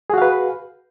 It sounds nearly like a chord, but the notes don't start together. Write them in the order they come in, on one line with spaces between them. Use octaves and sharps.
G#4 F#4 F5 B4